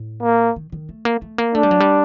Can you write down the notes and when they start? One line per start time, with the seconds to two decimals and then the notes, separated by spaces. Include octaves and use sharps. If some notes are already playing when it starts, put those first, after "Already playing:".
Already playing: A2
0.22 A#3
0.56 D#3
0.72 D#3
0.89 A3
1.05 A#3
1.22 A3
1.38 A#3
1.55 A3 D4
1.63 G3
1.71 F#3
1.80 G3